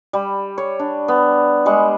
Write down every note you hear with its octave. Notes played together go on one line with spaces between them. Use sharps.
G3
C#5
D4
B3
G3 G#3 C#6